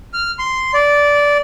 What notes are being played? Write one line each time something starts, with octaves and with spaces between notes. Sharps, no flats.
F6
C6
D5